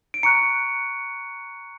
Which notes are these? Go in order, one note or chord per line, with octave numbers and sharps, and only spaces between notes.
D7
A#5 C#6 F#6 C#7